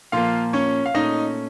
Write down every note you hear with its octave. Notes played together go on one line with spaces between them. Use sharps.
A#2 F3 A#3 F4 F5
C#4 C#5
F5
A#2 A3 C#4 D#4 D#5